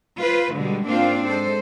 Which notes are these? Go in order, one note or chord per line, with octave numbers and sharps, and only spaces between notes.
F4 B4 C5
B2 D3 G3 G#3
G#2 A#3 C4 D4 F4 F5
G#3 A4 C5